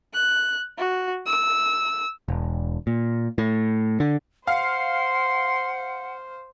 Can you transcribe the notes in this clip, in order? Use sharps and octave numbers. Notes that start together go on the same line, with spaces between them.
F#6
F#4
E6
E1
A#2
A2
D3
C5 F5 F#5 C6